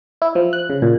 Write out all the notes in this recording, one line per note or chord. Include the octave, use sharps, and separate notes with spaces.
E4
F3
F#6
C#3
A#2